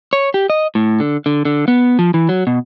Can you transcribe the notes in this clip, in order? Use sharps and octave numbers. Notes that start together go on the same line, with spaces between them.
C#5
G4
D#5
A2
D3
D3
D3
B3
F3
E3
F#3
B2